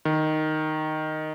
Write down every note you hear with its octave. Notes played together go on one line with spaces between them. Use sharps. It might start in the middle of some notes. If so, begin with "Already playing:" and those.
D#3